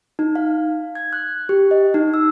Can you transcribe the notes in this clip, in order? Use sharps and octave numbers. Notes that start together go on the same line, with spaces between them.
D#4
F5
G#6
F#6
G4
D#5
D#4
E6